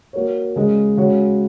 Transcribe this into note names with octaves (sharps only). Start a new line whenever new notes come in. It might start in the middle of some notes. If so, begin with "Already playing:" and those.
A#3 F#4 A#4 C#5
C#3 G#3 C#4 G#4 D#5
C#3 G#3 F#4 C#5